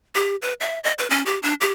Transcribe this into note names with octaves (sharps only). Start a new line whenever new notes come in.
G4
B4
E5
D#5
B4
C#4
G4
D4
G4